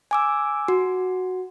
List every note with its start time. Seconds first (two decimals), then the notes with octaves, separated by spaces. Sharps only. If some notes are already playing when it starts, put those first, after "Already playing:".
0.11 G#5 D6 E6
0.68 F#4